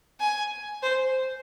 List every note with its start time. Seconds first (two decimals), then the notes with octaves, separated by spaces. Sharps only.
0.20 G#5
0.83 C5